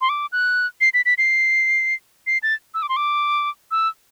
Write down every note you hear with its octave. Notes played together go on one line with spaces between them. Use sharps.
C6
D6
F#6
C7
B6
B6
C7
C7
A6
E6
D6
C6
D6
E6